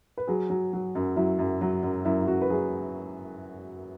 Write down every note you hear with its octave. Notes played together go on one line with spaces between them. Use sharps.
B4
F#3 G#4
F#3
F#3
F#2
F#3 E4
F#2
F#3
F#2
F#2 E4
E4
F#2 F#4
B4
F#3 G#4